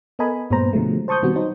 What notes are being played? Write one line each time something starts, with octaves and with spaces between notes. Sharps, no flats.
B3 A4 A#4 D#5 G#5 B5
G2 A#2 G#3 B3 C5 A#5
B2 D3 F3 F#3 G#3 A3
C5 A5 C#6 D#6 G6
B2 D#3 G3 B3 C4 F#4
F#3 D#4 C5